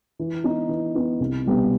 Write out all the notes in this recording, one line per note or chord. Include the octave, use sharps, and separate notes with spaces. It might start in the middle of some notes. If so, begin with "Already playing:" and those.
E3
B3 D#4
E3
B3 D#4
C2
B2 G3 B3